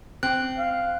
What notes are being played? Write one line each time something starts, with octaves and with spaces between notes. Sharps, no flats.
C4 F#6
F5